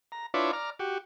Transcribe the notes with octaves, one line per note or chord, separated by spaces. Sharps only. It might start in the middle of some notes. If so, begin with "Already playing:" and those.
A#5
D4 E4 F4 B4 C#5 D5
D5 A#5 F6
F#4 G4